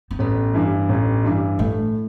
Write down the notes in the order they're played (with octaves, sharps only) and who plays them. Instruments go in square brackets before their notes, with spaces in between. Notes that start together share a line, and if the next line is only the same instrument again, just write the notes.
[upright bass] C4
[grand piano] A1 [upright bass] B3
[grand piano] G2 E3
A1
G2 E3
[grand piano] A2 [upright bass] A3